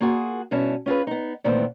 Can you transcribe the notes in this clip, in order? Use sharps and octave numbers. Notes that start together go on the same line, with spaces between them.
A#3 F4 F#4 G#4
G2 B2 C#4 E4 A5
C#4 F4 G#4 B4
B3 D#4
A#2 D#3 E3 A3 B3 C4